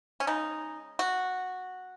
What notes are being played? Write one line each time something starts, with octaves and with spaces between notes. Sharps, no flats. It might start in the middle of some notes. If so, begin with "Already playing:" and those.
C#4
C#3 G#3 D#4
F#4